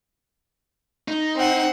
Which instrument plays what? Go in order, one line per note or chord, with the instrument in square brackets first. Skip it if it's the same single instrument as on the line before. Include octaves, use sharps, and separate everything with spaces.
[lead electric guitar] D#4
[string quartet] C4 F#5